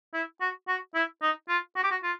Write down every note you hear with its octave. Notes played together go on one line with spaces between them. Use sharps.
E4
F#4
F#4
E4
D#4
F4
F#4
G4
F#4
F4